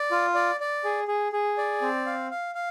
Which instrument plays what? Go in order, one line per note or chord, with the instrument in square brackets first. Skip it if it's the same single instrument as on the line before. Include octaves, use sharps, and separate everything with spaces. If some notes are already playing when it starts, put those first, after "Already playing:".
Already playing: [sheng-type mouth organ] D5
F4
D5
D5
G#4
G#4
G#4
D5
C4
F5
F5
F5